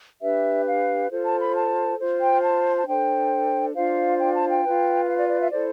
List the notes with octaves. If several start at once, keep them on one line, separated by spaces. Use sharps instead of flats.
D4 G4 B4 E5
F5
F4 A4 C5
A5
B5
A5
F4 C5
G5
A5
A5
D4 A4 C5 G5
D4 F4 C5 F5
G5
A5
G5
F4 B4
F5
D5
D5
E5
E4 A4 C5 D5